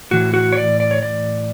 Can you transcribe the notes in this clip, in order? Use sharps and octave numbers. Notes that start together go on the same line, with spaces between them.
A2 E3 F#4
F#4
C#5
D5
D5
C#5
D5